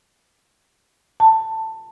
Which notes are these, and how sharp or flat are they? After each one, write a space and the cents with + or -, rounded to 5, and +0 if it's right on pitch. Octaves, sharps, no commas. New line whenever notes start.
A5 +15